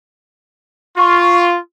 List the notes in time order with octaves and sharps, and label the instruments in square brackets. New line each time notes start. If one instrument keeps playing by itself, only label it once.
[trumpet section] F4 [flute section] C#6